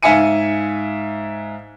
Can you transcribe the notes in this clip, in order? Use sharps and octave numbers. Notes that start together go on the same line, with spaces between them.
G#2 E5 F5 G#5 C#7 D#7